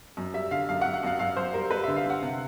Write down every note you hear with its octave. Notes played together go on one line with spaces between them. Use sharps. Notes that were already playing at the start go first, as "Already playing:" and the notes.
F#2
G3 E5
D3 F5
F#2 F5
F#5
F#2
F#5
F#2 F5
F#2 F5
F#2 C5
G3 A#4
G3 B4
D3 E5
F5
D3 F#5
C3